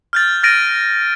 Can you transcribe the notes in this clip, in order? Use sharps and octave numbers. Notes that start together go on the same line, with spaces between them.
F6 G6 A6
F6 A6 A#6 D7 D#7